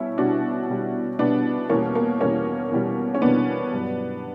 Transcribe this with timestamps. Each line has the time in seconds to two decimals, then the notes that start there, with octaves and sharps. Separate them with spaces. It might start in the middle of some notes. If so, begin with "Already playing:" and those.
Already playing: B2 G3 C#4 E4
0.18 B2 G3 D4 F#4
0.68 B2 G3
1.19 B2 G3 B3 D4
1.69 E2 B2 G3 A#3 C#4
1.95 A#3
2.21 E2 B2 G3 A#3 C#4
2.71 E2 B2 G3
3.15 C#4
3.22 E2 B2 G3 B3 D4
3.73 G2 F#3